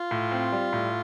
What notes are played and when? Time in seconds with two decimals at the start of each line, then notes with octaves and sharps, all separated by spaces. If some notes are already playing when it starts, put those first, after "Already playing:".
Already playing: F4
0.11 A2
0.32 C4
0.52 G3
0.73 A2